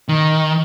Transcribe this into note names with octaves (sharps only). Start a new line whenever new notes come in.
D#3